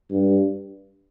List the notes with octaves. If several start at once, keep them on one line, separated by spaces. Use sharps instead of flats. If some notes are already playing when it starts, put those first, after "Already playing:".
G2